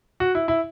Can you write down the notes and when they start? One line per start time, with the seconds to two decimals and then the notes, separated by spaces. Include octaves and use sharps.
0.20 F#4
0.35 E4
0.48 E4